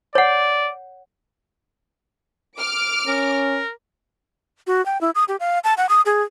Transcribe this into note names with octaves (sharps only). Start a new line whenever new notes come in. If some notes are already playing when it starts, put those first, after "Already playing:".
C#5 D5 F#5
D6 F6 D7
C#4 A#4
F#4
G5
E4
D#6
G4
F5
A5
F#5
D#6
G#4